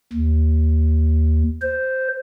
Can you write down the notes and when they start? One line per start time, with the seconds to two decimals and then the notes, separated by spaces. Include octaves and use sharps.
0.13 D#2
1.62 C5